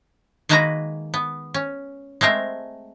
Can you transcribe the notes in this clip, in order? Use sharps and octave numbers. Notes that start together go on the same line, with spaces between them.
D#3 G#3 A#3 F#4 B4 A#5
B3
C#4
G#3 A3 C4 A#4